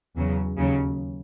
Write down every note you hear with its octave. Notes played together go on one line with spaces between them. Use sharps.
E2 C#3 F#3
D#2 C#3 F#3